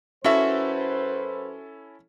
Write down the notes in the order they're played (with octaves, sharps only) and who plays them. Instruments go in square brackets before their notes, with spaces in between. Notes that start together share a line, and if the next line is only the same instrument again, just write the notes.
[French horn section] F#2 B4 C5 [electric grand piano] C#4 E4 A4 [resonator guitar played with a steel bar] F#4 E5